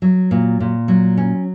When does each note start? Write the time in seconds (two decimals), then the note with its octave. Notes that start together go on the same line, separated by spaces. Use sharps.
0.02 F#3
0.31 A#2
0.60 A#2
0.88 F#3
1.17 C#4